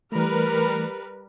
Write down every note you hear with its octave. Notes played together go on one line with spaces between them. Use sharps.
E3 G3 A3 A#4 B4